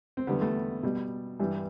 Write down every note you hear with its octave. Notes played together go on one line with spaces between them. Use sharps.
C4
E2 D3 G3 B3
A3
B2 G3
G2 E3 G3